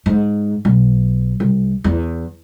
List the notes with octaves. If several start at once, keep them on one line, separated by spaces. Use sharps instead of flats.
G#2
B1
C2
E2